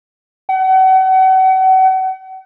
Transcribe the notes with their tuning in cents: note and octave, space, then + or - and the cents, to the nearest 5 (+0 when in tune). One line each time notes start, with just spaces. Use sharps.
F#5 +35